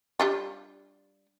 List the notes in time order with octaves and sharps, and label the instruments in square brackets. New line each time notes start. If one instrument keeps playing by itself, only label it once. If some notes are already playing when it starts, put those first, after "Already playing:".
[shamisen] G3 D4 F4